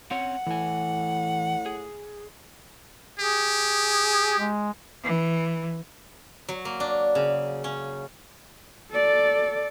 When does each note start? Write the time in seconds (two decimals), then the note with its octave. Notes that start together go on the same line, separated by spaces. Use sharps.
0.11 C4 C#4 C#5 F#5
0.46 A2 E3 G#5
1.66 G#4
3.19 G4 G#4
4.38 G#3
5.03 E3
6.49 F#3
6.65 A#3
6.80 D4
7.15 C#3
7.64 C#4
8.91 A4 D5